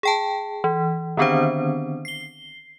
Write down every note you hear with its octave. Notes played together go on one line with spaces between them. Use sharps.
G#4 G5 A5
E3
D3 D#3 B3 C4 D4 C5
C7 G7